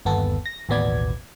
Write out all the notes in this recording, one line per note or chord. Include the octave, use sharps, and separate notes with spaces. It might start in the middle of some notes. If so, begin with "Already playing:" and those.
G1 D#2 B3 A4
A#6
A1 D#2 B2 B3 D5 G#6